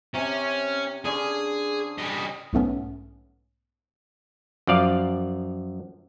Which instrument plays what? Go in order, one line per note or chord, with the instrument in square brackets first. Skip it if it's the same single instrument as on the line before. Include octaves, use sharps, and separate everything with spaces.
[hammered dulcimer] C3 [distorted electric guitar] C#4
[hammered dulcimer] D3 C#4 [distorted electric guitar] G#4
[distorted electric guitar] G3 D#5
[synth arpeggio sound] B1 G#2 A3 B3 C#4
[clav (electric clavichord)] F#2 F3 D5 F5